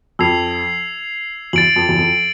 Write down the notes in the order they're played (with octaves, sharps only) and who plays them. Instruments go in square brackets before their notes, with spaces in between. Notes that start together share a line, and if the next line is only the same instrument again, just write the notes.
[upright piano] F2 [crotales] E6 G#6 C7 F7
[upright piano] E2 [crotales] F#7
[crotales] A6 D7
[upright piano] F2
E2
F2